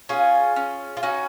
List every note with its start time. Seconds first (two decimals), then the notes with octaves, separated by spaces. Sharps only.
0.09 C#4 F4 G#4
0.56 C#4
0.97 F4
1.03 C#4 D#4 F#4